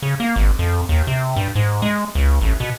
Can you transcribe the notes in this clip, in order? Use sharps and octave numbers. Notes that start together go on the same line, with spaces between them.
C#3
A#3
G#1
F2
D#2
C3
G2
G#2
G#3
C#2
A1
B2